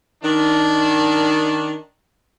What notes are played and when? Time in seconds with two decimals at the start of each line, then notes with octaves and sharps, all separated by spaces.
0.24 D#3 D4